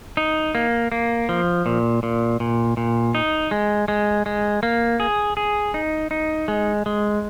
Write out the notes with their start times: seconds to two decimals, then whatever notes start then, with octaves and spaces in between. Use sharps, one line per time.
0.17 D#4
0.55 A#3
0.92 A#3
1.29 F3
1.66 A#2
2.03 A#2
2.40 A#2
2.77 A#2
3.15 D#4
3.51 G#3
3.88 G#3
4.26 G#3
4.63 A#3
5.00 G#4
5.37 G#4
5.74 D#4
6.11 D#4
6.48 G#3
6.86 G#3